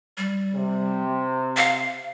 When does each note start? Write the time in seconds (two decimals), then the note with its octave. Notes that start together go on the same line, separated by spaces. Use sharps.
0.18 G3
0.54 C3
1.57 F5